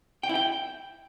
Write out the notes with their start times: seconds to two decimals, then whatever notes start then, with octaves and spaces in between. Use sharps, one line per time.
0.23 G5
0.29 E4
0.35 G5